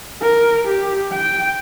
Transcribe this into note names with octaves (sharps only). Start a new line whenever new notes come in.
A#4
G4
G5